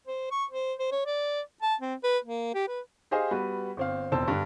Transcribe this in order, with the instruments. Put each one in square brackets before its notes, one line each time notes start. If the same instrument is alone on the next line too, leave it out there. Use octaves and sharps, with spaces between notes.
[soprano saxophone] C5
C#6
C5
C5
C#5
D5
A5
C4
B4
A#3
G4
B4
[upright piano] G4 G#4 C5 D#5 F5
G3 B3 F#4 B4
G1 C4 F5
E1 F2 C5 A5 E6
G2 D3